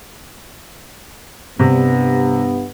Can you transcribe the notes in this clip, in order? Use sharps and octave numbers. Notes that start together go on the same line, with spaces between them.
G2 C3 B3